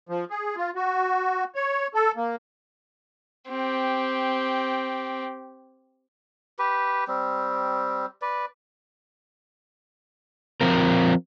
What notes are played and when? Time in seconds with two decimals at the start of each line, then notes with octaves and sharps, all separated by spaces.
0.09 F3
0.30 G#4
0.56 F4
0.75 F#4
1.55 C#5
1.94 A4
2.17 A#3
3.49 C4 G4
6.59 G4 B4
7.08 G3 C4
8.22 B4 D5
10.61 F3 C4 A#4